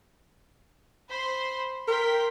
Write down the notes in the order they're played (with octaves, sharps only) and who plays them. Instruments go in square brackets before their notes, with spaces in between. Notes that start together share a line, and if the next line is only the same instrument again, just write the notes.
[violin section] C5 B5 C6
[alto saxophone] A#4 [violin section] G5 C6 B6